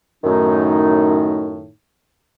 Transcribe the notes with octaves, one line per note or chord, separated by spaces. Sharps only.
F#2 A2 D#3 A3 D#4